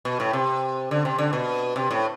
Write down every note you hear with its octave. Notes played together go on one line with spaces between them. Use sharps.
B2
A2
C3
D3
C3
D3
B2
C3
A2